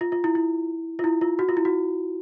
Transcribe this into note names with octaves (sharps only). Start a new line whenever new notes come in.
F4
F4
E4
E4
F4
E4
F4
F#4
F4
E4
F#4